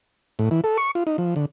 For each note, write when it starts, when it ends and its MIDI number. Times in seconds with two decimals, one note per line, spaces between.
0.39 0.49 45
0.51 0.61 52
0.64 0.77 69
0.77 0.91 85
0.95 1.04 65
1.07 1.17 63
1.18 1.35 53
1.36 1.46 50